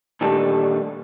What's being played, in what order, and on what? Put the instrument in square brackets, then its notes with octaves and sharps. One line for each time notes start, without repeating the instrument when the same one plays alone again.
[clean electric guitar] A#2 D3 D#3 G3 A3 A4